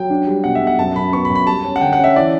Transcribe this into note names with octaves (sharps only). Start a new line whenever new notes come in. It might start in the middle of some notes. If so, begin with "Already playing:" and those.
Already playing: F#3 G5
D4
G3
B2 F#5
E5
B1
F#5
F#2 A5
F#2 B5
B3 C#6
B5
F#2
B5
G3 A5
C#4
F#5
D3 G5
F#5
C#4 E5
E3 D5